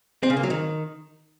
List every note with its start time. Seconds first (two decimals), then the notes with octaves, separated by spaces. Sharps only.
0.23 C4
0.30 C#3
0.37 A#3
0.43 F#3
0.50 D#3